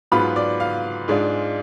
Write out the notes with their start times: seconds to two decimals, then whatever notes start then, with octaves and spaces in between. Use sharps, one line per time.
0.12 G#2 F#3 B3 F4 B5
0.36 D5
0.60 F5
1.08 G#2 G#3 D4 F4